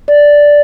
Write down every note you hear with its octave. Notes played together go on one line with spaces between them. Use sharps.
D5